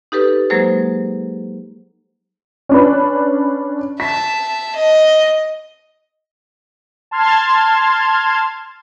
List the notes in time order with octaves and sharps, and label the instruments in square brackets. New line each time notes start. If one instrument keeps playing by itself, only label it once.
[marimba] D#4 G4 A4 B4
F#3 G#3 A#3 G#4 C5
[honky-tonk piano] C#4 D4 B4
[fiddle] E5 A5 [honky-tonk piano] B6
[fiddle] D#5
[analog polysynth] A5 C6 F6 G#6